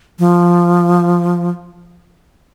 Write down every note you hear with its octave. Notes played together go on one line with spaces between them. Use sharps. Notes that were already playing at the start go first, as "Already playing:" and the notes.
F3